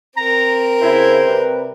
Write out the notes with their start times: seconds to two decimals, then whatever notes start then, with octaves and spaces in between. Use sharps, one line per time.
0.17 C4 A#4 A#5
0.81 C#3 E4 C5
1.24 C3 G3 B4